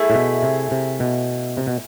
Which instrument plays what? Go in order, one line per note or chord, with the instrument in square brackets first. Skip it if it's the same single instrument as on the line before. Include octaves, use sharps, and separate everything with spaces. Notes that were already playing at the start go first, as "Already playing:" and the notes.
Already playing: [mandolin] A3 E4 G#4
[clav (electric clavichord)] A2
B2
C3
C3
B2
C3
B2